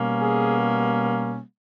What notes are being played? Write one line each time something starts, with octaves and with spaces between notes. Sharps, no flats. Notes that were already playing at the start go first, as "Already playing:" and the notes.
Already playing: B2 G3 A#3 C#4
G#4